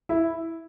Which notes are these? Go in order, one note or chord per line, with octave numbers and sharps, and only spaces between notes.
E4